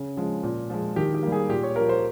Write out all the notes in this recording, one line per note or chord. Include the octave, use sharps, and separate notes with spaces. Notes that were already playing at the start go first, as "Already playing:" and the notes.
Already playing: C#3
F3 G#3
A#2
F3 G#3
D#3 G4
G4
G3 A#3
G#4
A#2 G4
C#5
F3 A#3 A#4
C5